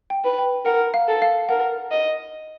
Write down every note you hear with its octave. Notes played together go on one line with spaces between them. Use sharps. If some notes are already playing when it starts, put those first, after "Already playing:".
G5
B4
G5
A#4 F#5
F5
A4
F5
A#4 F#5
D#5